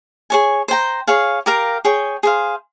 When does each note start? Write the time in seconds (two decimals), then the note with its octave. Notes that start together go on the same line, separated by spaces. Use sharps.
0.30 G#4 C#5 G#5
0.68 C5 G5 A#5
1.07 G#4 C#5 F5
1.46 G4 A#4 F5 A#5
1.85 G#4 C#5 G5
2.23 G#4 C5 F5